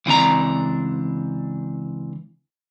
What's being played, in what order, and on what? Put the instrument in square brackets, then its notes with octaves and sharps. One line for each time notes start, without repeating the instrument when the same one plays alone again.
[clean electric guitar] C#2 E3 C4 D4 A#5